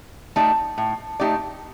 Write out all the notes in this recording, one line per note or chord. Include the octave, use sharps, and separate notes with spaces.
A3 D#4 G4 D5
A2
A3 D#4 G4 D5